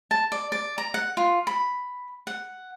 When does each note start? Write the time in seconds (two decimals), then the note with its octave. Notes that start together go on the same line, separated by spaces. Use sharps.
0.11 A5
0.32 D5
0.52 D5
0.78 A#5
0.94 F#5
1.17 F4
1.47 B5
2.27 F#5